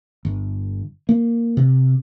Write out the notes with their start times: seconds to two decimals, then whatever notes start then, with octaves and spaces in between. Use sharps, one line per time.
0.25 G1
1.09 A#3
1.57 C3